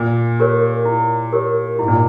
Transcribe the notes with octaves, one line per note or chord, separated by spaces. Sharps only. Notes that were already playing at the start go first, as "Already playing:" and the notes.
Already playing: A#2
G4 A#4 C#5
E4
G4 A#4 C#5
G#2 E4
A#2